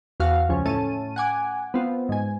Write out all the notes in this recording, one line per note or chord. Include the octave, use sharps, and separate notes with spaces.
E2 F#4 F5
C#2 F3 C#4
A2 A3 C#4 A5 D#7
F#5 G#5 D6
B3 C4 F4
G#2 G#5